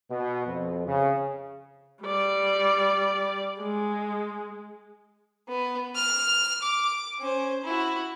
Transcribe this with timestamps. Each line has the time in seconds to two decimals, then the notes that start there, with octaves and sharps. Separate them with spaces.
0.10 B2
0.47 F2
0.87 C#3
2.03 G3 D5
3.60 G#3
5.49 B3
5.95 F6
6.63 D6
7.20 C#4 C5
7.64 E4 F#4